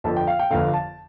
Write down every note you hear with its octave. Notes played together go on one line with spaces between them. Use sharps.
G1 F2 D3 A5
G5
F5
G5
G1 F2 D3 F5
A5